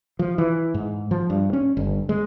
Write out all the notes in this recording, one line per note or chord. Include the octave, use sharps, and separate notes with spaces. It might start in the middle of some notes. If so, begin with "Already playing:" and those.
F3
E3
G#2
F3
G2
C#4
G1
G#3